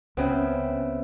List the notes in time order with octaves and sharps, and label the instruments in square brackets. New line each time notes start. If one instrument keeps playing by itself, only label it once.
[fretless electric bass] C#2 [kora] C#3 C4 [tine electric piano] B3 B4 E5